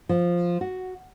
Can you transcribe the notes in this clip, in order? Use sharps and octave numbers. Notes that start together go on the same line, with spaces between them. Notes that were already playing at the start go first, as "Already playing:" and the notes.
F3
F#4